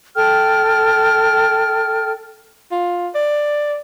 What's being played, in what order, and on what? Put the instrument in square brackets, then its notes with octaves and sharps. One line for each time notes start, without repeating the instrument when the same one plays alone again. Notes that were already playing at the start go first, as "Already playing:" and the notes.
[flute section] A4 G5 F6
[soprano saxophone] F4
D5